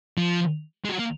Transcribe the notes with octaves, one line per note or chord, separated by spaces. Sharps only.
F3
G#3
F#3
A#3